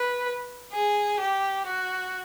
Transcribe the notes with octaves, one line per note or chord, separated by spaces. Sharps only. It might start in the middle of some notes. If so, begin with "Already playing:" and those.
Already playing: B4
G#4
G4
F#4